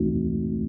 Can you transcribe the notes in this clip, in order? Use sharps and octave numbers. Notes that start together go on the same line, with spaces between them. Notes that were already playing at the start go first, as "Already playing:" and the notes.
Already playing: E3 A3 C4 D#4 F#4